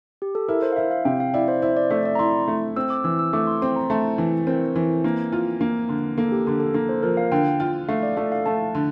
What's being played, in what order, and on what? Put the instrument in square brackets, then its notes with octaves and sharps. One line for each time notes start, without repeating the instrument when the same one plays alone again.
[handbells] G4
A4
[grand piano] E4 [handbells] A#4
[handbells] C5
F5
[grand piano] E4 [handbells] E5
[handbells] F5
[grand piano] C3 [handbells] G5
[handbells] F5
[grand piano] E4 [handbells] D5
[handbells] C5
[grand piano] E4 [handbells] C5
[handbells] D5
[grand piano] A3 [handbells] E5
[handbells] D5
A#5
[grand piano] E4 [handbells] C6
[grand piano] A3
[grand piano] C4 [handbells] E6
[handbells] D6
[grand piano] E3 [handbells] E6
[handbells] E6
[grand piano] A3 [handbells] D6
[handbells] C6
[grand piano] C4 [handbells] C6
[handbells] A#5
[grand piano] A3 [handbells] A5
[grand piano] E3
[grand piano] C4 [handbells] A#4
[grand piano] E3
A#3
F4
A#3
D3
[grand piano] A#3 [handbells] A4
[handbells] G4
[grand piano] D3 [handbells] A4
[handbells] A4
[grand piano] A#3 [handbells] A4
[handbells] C5
[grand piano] F3 [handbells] A#4
[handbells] F5
[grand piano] D3 [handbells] G5
[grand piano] F4
[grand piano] A3 [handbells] F5
[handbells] D5
[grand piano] A3 [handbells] A4
[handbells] F5
[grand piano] A3 [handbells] A5
[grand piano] D3